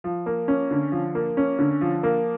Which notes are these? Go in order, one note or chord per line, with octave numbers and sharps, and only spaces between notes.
F3
A#3
C#4
D3
F3
A#3
C#4
D3
F3
A#3